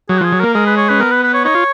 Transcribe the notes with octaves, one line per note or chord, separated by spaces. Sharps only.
F#3 G#4
F#4
F3 G#4
F#3
A#3 A#4
G#3 A#4
B4
C#5
C#4 B4
B3 A#4
B4
B4
C#5
D#4 C#5
F4